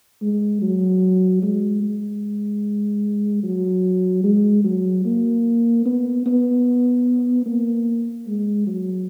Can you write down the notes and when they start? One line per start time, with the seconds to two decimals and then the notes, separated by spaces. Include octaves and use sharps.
0.22 G#3
0.62 F#3
1.43 G#3
1.82 G#3
3.43 F#3
4.24 G#3
4.64 F#3
5.05 A#3
5.85 B3
6.26 B3
7.46 A#3
8.27 G#3
8.67 F#3